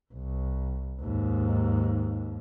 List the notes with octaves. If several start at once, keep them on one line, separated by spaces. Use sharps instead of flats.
C2
D#2 G#2